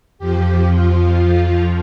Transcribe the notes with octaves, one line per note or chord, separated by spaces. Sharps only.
F2 F3 G4
F4